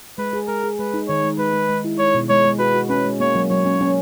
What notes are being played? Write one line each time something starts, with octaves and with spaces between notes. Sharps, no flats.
G#3 B4
G#4
G#3 A#4
G#4
G#3 B4
D#4
D#3 C#5
G#3
G#3 B4
G#3
G#3
E4
G#3 C#5
B2
G#3 C#5
G#3
F#4 B4
F#4
C#4 B4
G#3
A#3 C#5
F#3
F#3 C#5
C#4
C#4